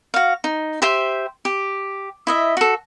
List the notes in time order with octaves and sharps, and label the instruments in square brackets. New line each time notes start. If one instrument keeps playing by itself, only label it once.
[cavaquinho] F#4 F5
D#4
G4 C5 E5 G5
G4
E4 D#5 E5
F#4 A4